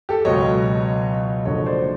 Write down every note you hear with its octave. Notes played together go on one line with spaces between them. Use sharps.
G4 A4
C#2 B2 F#3 C#5 D#5
F#1 F#2 D3 F3 C#5 D#5
C5 D5